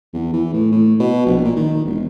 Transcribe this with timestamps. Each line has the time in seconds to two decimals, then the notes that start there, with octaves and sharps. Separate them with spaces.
0.13 E2
0.33 E3
0.53 A2
0.72 A2
1.00 B2
1.26 A#1
1.44 A#2
1.56 D#3
1.85 E1